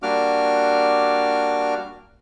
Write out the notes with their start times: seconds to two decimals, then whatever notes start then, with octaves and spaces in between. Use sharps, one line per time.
0.03 G3 A#3 D4 F#4 D6 F6